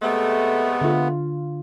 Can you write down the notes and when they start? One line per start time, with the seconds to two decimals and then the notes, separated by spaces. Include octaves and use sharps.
0.02 C3 G#3 A3 B3
0.81 D3 F4